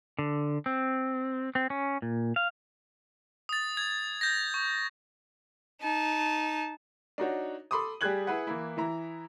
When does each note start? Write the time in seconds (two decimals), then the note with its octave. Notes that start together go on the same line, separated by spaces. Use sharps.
0.19 D3
0.66 C4
1.55 C4
1.70 C#4
2.02 A#2
2.36 F5
3.49 D#6 A6
3.77 D#6 G#6
4.21 G6 A#6
4.54 C#6
5.81 D#4 A5
7.18 D4 D#4 F#4 C#5
7.71 A4 B5 C6 D6 D#6
8.01 G3 G4 G#4 F#6 G#6 F#7
8.27 E4 G#4 B4 F#5
8.47 E3 A#3 E4
8.77 E3 E4 A#5